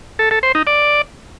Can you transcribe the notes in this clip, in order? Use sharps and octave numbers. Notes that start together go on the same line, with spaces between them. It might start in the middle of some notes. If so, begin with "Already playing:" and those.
A4
A4
C5
D#4
D5